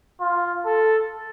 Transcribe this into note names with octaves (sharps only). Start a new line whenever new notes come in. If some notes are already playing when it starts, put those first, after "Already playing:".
F4
A4